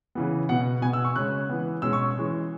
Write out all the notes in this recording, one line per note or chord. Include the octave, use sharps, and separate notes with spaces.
C#3 E3 B3
B2 B3 F#5
B2 B3 G#5
E6
C#6
C#3 G#3 C#4 F#6
E3 B3
B2 G#3 C#4 E6
C#6
E3 G#3 C#4